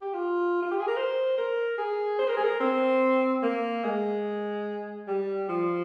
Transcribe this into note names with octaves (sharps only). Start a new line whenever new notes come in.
G4
F4
F4
G4
G#4
A#4
C5
A#4
G#4
C5
A#4
G#4
A#4
C4
A#3
G#3
G3
F3